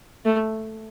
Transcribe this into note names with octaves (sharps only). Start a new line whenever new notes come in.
A3